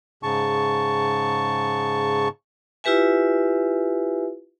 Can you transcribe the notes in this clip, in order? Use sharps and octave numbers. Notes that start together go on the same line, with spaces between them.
G#2 C#3 A5 C#6
E4 F4 G4 B4 E5 G#5